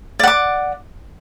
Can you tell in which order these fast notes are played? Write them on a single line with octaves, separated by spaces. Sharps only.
D5 F#5 D6